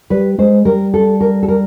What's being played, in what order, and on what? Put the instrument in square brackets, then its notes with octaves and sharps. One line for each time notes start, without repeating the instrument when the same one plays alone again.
[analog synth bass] G3 [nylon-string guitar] B4
[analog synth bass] G#3 [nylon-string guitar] C5
[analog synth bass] G3 [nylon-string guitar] A#4
[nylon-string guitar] A4
A#4
A4
A#4